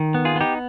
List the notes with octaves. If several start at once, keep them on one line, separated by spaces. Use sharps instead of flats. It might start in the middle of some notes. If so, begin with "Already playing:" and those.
Already playing: D#3
B3
F4 G#4
B3 D#4 G4